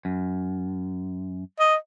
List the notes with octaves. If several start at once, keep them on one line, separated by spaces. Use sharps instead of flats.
F#2
D#5